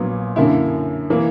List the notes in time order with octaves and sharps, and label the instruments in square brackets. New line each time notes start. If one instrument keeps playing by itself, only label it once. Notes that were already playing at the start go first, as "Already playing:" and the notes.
Already playing: [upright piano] A#1 A#2 F#3 B3
F#2 D3 A#3 E4
E3 A#3